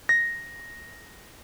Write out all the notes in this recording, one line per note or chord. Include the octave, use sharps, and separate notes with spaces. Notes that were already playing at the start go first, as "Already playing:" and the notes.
A#6